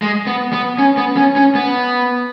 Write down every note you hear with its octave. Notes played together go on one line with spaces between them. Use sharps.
G#3
B3
B3
C#4
B3
C#4
C#4
B3